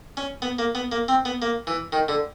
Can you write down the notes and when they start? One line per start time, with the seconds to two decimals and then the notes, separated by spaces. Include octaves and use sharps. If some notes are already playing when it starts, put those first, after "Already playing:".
0.17 C#4
0.42 B3
0.59 A#3
0.75 B3
0.92 A#3
1.08 C4
1.25 B3
1.42 A#3
1.67 E3
1.92 D#3
2.08 D3